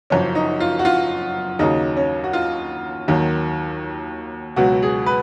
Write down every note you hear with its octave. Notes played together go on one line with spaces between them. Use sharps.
F#1 F#2 F3 C#4
D#4
F4
F#4
F4
D#2 C#3 F#3 D#4
C#4
F#4
F4
D#2 D#3 F#3
C#2 B2 F#3 F#4
G#4
B4